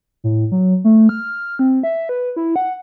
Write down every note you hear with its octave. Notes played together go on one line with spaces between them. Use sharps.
A2
F#3
A3
F6
C4
E5
B4
E4
F#5